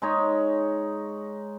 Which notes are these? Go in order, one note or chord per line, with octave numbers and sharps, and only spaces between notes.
G#3 D#4 C#5